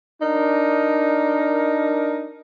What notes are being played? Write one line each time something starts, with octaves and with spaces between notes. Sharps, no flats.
D4 D#4 A#4